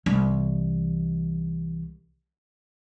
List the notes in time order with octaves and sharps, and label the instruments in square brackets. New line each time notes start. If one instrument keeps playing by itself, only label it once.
[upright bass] C2 E3